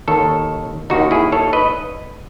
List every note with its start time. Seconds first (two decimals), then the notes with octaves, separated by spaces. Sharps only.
0.08 D#2 D#3 A4 C#5
0.90 D#2 D#3 D#4 F#4
1.11 E4 G#4
1.32 A4 C#5
1.53 B4 D#5